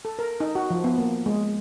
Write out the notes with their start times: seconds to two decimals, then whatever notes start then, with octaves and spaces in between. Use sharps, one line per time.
0.05 A4
0.19 A#4
0.40 D#4
0.55 F#4
0.70 F3
0.84 B3
0.98 A#3
1.26 G#3